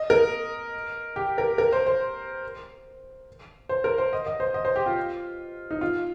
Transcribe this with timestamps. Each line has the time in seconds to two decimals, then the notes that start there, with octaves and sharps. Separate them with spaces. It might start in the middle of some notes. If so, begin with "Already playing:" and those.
Already playing: D#5
0.10 A#4
1.16 G4
1.38 A#4
1.58 A#4
1.73 C5
1.86 C5
3.69 C5
3.84 A#4
3.98 C5
4.13 D#5
4.27 D#5
4.40 C5
4.54 D#5
4.65 C5
4.76 G4
4.86 F4
5.71 D#4
5.81 F4